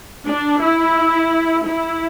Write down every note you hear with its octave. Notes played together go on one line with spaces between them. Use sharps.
D4
E4
E4